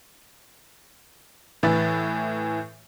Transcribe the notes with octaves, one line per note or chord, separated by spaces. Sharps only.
A2 E3 B4 E5 A6